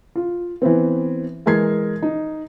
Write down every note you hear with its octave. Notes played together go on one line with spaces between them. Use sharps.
F4
E3 B3 C4
E3 G#3 A#4 G#6 C7
D#4